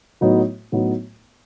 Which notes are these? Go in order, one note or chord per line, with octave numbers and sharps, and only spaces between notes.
A2 F#3 B3 D#4 F#4
A2 F#3 B3 D#4 F#4